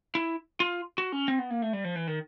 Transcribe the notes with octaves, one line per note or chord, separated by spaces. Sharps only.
E4
F4
F#4
C#4
C4
B3
A#3
A3
G3
F3
E3
D#3